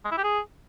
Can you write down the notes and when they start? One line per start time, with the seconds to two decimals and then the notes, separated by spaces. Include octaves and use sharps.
0.05 G#3
0.11 E4
0.18 G4
0.24 G#4